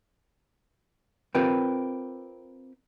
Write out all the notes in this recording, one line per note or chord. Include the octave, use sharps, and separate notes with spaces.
C4 F4 G4 A#4 B4